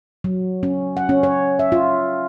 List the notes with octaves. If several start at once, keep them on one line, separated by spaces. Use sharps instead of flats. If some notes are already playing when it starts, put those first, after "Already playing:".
F#3
C#4
F#5
C#4
C#5
E5
F4